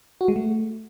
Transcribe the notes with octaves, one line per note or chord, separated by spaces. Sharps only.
F#4
G#3
A3